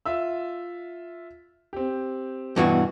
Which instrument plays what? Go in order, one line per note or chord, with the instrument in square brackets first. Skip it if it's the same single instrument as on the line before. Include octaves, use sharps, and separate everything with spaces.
[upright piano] F4 E5 E6
C4 G4
[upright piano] E2 B2 [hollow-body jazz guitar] G2 E3 F#4